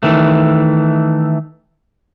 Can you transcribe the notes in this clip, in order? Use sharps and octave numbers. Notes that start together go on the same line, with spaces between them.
D#3 E3 A3